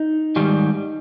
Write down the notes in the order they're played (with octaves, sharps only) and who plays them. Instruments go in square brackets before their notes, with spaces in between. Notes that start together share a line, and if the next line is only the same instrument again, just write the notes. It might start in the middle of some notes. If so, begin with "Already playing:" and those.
Already playing: [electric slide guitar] D#4
G#2 D#3 G3